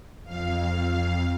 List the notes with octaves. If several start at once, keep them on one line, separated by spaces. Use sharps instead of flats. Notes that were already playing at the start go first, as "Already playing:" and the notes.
F2 F5